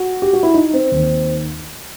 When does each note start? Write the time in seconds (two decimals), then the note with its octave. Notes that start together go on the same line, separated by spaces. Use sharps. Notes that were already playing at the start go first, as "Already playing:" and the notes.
Already playing: F#4
0.22 G4
0.33 F#4
0.43 E4
0.54 D#4
0.74 C4
0.91 D#2 D#3